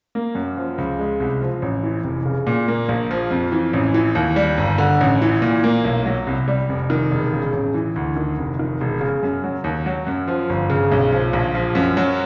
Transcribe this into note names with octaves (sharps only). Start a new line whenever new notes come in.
A#3
F#2
F3
C#2
G#3
C2
F3
A1
E3
F1
C#3
A#2
A#3
A#1
F3
F2
E3
A1
E3
D#2
G3
G1
D3
A1
E3
A#2
A#3
B1
F#3
C2
G3
F1
D#3
E1
C#3
A1
E3
D2
D#3
F1
D#3
E1
C#3
F#2
F#3
D#2
F#3
F#2
F3
G1
C#3
B1
F3
A#1
F3
F#2
F#3